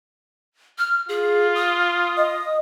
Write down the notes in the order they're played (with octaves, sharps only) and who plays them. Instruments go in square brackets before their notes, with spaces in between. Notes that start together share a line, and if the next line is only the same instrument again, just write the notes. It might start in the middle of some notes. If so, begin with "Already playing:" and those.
[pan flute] F6
[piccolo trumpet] F4 [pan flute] G#4
[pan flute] D#6
[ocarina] D#5